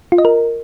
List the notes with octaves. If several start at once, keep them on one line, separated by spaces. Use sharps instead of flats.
F4
D#5
A#4